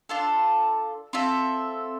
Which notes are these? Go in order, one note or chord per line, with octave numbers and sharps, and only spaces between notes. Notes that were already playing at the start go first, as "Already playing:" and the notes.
D4 F4 A4
C4 F4 A4 E5